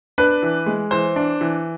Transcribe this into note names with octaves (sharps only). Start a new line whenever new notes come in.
D4 B4
E3
G#3
E3 C5
D4
E3